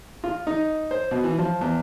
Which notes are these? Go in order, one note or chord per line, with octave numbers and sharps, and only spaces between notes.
F4
D#4
C5
B2
E3
F3
E2